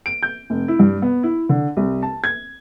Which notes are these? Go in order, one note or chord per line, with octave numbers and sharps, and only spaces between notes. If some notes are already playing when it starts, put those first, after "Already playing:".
D7
G6
F1
E4
G2
B3
E4
D3
C2
A5
G#6